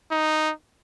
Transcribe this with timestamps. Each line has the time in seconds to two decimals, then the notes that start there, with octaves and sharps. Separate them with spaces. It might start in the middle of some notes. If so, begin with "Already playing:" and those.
0.11 D#4